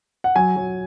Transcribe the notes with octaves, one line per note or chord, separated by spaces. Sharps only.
F#5
F#3 G#5
F#3